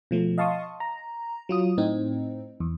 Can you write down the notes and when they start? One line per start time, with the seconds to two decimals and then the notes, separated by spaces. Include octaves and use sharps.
0.11 B2 F3 A3
0.38 D#5 F5 A5 C6 C#6 D#6
0.80 A#5
1.49 F#3 F4 D#6
1.78 A2 C4 D#4
2.60 E2